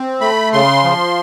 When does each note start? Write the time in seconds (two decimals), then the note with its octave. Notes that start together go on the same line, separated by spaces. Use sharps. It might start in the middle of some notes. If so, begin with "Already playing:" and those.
Already playing: C4
0.21 A3 B5
0.53 C#3 C6
0.84 F3